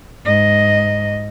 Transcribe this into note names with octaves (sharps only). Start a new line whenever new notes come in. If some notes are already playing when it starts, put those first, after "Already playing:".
G#2 D#5